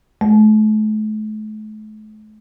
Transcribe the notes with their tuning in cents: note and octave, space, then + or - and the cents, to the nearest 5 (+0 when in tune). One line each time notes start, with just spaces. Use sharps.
A3 -40